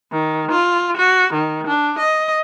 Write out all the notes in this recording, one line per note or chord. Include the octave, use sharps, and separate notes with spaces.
D#3
F4
F#4
D#3
D4
D#5